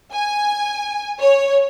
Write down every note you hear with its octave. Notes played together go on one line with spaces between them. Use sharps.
G#5
C#5